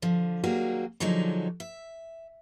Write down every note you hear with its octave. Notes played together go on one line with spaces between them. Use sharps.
D3 F3
D#3 F#3 G3 A#3 F#4 G#4
D3 F3 F#3 G#3 D4 D#4
E5